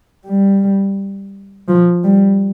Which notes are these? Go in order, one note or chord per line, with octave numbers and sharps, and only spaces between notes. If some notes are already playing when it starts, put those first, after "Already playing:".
G3
F3
G3